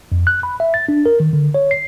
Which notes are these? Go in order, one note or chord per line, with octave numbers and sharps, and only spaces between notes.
F2
F#6
B5
E5
A6
D4
A#4
D#3
D3
C#5
C7